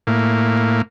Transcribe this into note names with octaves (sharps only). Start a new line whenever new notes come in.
A2 A#3